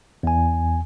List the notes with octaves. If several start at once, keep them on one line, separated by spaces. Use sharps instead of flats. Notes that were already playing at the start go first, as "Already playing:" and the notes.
E2 G#5